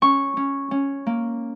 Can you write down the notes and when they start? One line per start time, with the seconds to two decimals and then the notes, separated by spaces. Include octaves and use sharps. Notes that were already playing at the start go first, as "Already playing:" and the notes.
0.02 C#4 C#6
0.37 C#4
0.71 C#4
1.06 A#3